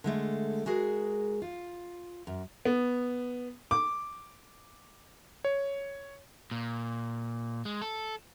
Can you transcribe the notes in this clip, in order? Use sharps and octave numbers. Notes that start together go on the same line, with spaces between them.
D3 G#3 A3
G#3 F#4 G#4 A#4
F4
F#2
B3
D6
C#5
A#2
G#3
A4